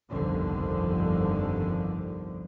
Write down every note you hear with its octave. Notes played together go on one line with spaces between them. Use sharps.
G1 C2 F2 D3 D#3 F3